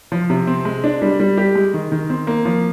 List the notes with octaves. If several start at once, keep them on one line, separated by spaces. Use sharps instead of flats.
F3
C3
C4
G#3
D4
G3
G3
G4
G#3
D#3
D#3
C4
A#3
F3